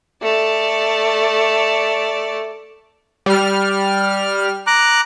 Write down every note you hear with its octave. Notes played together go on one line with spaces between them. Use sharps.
A3 D5
G3 F6
A#5 D6 F#6